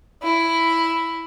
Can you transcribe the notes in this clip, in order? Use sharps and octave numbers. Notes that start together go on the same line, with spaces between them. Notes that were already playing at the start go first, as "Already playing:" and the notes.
E4